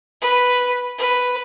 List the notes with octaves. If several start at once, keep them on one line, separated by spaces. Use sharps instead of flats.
B4
B4